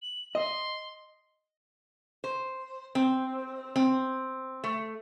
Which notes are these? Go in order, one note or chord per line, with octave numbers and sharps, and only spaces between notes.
F#7
D#5 C6
C5
C4
C4
A3